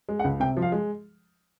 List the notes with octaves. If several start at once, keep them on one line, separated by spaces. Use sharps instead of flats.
G#3
F#5
C#2
C3 G5
F3
F5
G#3